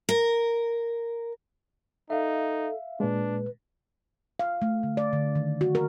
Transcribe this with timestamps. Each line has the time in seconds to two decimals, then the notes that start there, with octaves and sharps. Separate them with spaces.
0.09 A#4
2.10 D#4 A4 E5 F5
3.00 A#2 G#3 D4 B4
4.39 F5
4.62 A3
4.83 D3
4.97 D5
5.13 D3
5.35 D#3
5.61 F#4
5.75 A#4